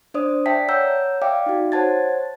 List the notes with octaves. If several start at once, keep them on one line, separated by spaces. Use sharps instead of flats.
D4 C5 D5 D#6
D5 E5 G5 A5 B6
C#5 F#5 A#5 E6 G6
D5 E5 F5 G5 D6
D#4 F#4
C5 C#5 F#5 A5 G#6 A6